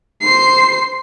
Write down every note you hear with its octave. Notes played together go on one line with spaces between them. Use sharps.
C5 C7